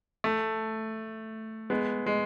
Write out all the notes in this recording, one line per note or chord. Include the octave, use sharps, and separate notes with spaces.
A3
G#3 B3
G#3